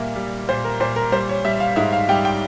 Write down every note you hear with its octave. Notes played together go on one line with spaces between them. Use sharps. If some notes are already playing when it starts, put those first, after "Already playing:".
Already playing: A#2 G3 A#3 E5
G3
A#2 C5
A#4
A#2 C5
A#4
G3 C5
C#5
G3 E5
F5
G#2 E5
F5
G3 G5
G5